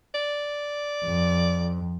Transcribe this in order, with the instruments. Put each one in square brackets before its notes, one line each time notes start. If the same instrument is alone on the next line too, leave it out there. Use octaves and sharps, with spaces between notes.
[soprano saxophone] D5
[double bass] F2